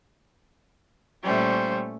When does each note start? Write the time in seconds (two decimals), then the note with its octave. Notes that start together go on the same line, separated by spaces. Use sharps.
1.23 A#2 G3 A3 C#4 C5